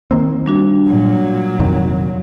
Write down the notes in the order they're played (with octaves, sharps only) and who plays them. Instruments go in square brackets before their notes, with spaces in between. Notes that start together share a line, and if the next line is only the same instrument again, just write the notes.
[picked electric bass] D#3 A#3 C4
[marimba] G3 D4 F#4
[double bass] A#2 F#3
[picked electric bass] F2 C3 D#3